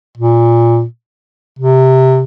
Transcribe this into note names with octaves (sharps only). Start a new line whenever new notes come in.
A#2
C3